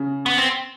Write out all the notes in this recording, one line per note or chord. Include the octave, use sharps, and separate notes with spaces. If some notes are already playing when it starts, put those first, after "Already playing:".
Already playing: C#3
B3
C4